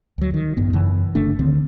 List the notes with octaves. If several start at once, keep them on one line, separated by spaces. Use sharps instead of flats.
D2 F#3
D#3
A1 G2 B3
F#2 C#3 E3
G1 D3 A3 D4
D2 D3 D#3 C4